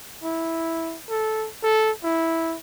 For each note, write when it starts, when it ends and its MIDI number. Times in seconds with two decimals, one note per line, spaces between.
0.24 0.97 64
1.09 1.48 69
1.63 1.91 69
2.04 2.56 64